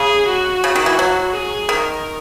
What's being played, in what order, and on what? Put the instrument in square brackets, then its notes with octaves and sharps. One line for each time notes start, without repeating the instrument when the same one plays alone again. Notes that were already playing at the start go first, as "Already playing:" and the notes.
Already playing: [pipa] C#3 [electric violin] G#4
[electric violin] F#4
[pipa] C#3
D#3
E3
F#3
[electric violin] G#4
[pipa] D#3 [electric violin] A#4